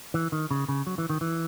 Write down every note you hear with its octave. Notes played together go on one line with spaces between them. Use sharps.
E3
D#3
C#3
C#3
F#3
E3
D#3
E3